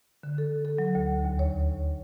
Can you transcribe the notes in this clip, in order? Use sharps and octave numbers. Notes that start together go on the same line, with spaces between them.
D3
A4
A4
F#3
D2
D#2
C#5